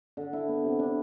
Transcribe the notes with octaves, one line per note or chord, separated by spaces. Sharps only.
D3
E4
B3
C3
D4